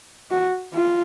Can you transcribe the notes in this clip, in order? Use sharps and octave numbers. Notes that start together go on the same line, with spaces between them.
F#4
F4